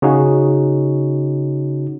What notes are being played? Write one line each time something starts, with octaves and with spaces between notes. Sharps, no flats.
C#3 C#4 D#4 F#4